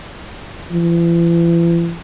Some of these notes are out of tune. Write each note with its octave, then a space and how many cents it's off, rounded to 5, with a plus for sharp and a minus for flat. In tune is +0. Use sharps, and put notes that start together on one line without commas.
E3 +45